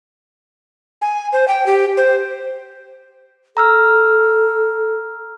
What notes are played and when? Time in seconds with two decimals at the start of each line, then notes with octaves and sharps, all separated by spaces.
1.02 G#5
1.33 C5
1.48 G5
1.66 G4
1.97 C5
3.57 A4 A#5 E6 F6